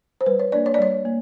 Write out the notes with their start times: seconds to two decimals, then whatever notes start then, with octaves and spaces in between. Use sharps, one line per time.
0.21 C5
0.26 G3 B4
0.39 C#5
0.52 A#3 D4 D5
0.66 C#5
0.74 D5
0.79 G3 C#5
1.05 A#3